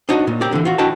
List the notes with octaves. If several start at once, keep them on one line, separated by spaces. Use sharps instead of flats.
D4 D#4 F#4 C#5 D#5
A#2
C4 G4 A#4 D5
D3 E3
F4 F#4
D4 E4 F#4 D#5 G5 A5